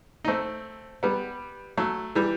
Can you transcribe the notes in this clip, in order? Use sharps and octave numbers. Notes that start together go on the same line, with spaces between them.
D#4
A3 C4
G3 B3
F#3 A3
E3 G3